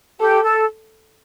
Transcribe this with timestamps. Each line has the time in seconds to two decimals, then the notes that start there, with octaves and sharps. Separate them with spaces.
0.20 G4 A4
0.43 A4